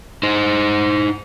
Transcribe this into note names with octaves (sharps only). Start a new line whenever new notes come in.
D#4 C5